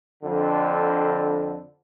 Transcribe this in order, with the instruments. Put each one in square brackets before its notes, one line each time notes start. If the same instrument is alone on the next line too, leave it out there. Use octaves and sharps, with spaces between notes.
[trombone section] F2 D3